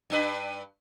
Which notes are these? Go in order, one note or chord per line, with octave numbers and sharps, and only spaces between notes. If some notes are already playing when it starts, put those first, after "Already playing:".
G2 D4 B4